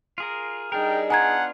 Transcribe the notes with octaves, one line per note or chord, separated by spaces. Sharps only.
F4 G#4 A#4
G3 D4 D#4 G#4 A#4 G5
B3 D4 F4 F#5 G#5 A#5 G#6